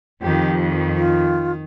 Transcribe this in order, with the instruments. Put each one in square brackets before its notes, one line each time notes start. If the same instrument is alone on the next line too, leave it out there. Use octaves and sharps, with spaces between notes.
[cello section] F2 [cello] D#3 G4
[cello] D#3
[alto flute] F4